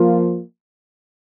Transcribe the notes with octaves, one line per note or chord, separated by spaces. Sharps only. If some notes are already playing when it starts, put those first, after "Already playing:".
Already playing: F3 A#3 F4